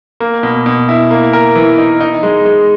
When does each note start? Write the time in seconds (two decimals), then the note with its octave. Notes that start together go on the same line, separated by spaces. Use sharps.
0.20 A#3
0.43 B2
0.66 B2
0.89 E4
1.11 A#3
1.33 A#4
1.56 E3
1.78 D#4
2.00 D#4
2.23 G#3
2.45 G#3